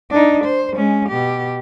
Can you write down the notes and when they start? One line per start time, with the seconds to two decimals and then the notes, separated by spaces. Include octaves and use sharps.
0.11 D4 D#4
0.45 C5
0.75 G#3 C#4
1.09 B2 G4